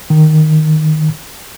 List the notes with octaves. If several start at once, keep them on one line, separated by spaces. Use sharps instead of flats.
D#3